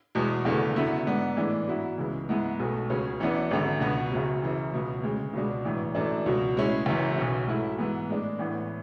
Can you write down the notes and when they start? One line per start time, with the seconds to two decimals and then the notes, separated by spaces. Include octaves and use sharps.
0.15 E2 B2 G#3
0.45 F#1 E2 D3 A3
0.76 F#2 D3 F#3 B3 E4
1.07 G#2 G#3 B3 D4
1.36 A2 E3 G#3 D4
1.68 G#2 F#3 B3 E4
1.98 C#2 C#3 E3 G#3
2.29 G#2 G#3 B3 E4
2.59 B1 B2 A3
2.90 C#2 C#3 F#3 C#4
3.20 F#2 E3 B3 D4
3.51 G#1 F#2 D3
3.81 C#2 B2 F#3 B3
4.12 F#1 F#2 C#3 F#3
4.42 F#2 C#3 E3
4.73 C#2 B2 G#3
5.03 D2 C#3 G#3
5.33 C#2 B2 G#3 D4
5.65 A1 G#2 E3
5.95 F#2 E3 A3 D4
6.26 C#2 B2 F#3
6.56 A2 G#3 C#4 E4
6.86 F#1 F#2 E3
7.17 B1 B2 F#3 C#4
7.47 G#2 F#3 A3 E4
7.78 G#2 E3 B3
8.09 A2 G#3 D4
8.38 A1 A2 E3 B3